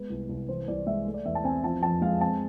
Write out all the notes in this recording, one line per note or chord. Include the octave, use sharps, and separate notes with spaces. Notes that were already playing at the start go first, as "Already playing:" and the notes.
Already playing: G#3 B3 B4
C2
C2
E3 C5
C2 D5
G#3 E5
A3
D5
E2 E5
A5
C4 G#5
F3 A5
F2 A5
G#3 F5
C4 A5